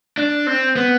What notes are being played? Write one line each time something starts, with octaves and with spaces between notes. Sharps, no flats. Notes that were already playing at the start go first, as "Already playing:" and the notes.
D4
C4
B3